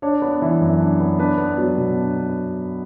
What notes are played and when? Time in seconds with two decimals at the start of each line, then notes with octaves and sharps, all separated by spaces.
0.02 D4 C#5
0.22 B3
0.42 E3
0.61 F#2
0.80 D4
1.00 B3
1.19 D4 B4
1.38 B3
1.58 F#3
1.78 B2
1.97 D4
2.16 B3